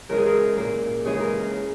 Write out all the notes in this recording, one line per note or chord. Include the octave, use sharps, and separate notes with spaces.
C#3 E3 G#3 A#4
G#4
A#4
A#2 A#3
C#3 E3 G#3 G#4
A#4